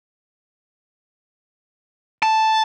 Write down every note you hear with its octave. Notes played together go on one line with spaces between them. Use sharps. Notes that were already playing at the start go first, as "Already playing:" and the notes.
A5